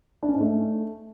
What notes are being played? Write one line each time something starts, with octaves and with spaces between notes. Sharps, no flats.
D4
C#4
G#2
A3